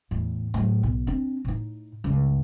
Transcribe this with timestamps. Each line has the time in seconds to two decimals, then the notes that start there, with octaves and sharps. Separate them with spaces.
0.11 E2 A2
0.54 A2 F#3
0.83 B1
1.07 C4 D4
1.45 A2 D#4
2.04 C#2 G2